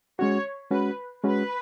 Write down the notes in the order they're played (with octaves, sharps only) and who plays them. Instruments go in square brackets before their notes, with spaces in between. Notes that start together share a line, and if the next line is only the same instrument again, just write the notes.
[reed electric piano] G#3 C#4 F#4 [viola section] C#5
[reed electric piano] G#3 C#4 F#4 [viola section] B4
[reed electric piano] G#3 C#4 F#4 [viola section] B4